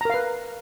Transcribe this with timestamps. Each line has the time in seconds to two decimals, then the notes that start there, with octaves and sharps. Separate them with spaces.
0.01 A#5
0.05 A#4
0.10 F5
0.14 B4